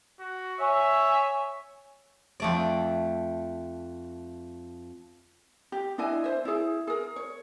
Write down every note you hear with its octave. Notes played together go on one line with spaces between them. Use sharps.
F#4
C#5 E5 G#5
F2 A3 D5
G4
D4 E4 D#5 G#5
C5 E5
E4 G#4
G#4 A#4
C#5